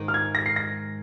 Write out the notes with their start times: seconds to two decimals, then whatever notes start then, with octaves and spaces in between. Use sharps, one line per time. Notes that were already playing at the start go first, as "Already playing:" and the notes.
Already playing: G#2 D#3 G#3 D#4
0.08 F6
0.14 G#6
0.35 A#6
0.46 C7
0.56 A#6